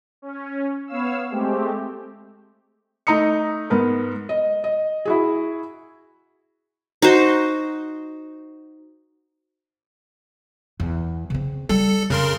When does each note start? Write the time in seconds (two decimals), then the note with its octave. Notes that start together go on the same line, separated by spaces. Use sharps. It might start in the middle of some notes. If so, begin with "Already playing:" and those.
0.22 C#4
0.87 B3 C#5 F5 E6
1.30 G#3 A3 C4 G4
3.07 A3 D#4 A#5 D#6 C#7
3.70 G#2 B3 A#4
4.29 D#5
4.64 D#5
5.05 E4 F#4 G#4
7.02 D#4 F#4 C5
10.80 E2
11.30 C#3 C4
11.69 G3 A4
12.10 F2 C#3 A#4 C6